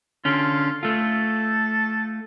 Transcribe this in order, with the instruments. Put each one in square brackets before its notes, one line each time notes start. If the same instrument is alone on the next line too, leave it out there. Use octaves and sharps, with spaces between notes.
[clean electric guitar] D3 C#4 [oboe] F4
[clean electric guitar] A3 F4 [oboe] A4